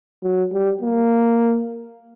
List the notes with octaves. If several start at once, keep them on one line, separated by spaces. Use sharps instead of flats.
F#3
G3
A#3